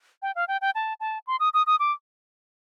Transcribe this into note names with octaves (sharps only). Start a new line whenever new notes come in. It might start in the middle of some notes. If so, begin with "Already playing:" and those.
G5
F5
G5
G5
A5
A5
C6
D#6
D#6
D#6
D6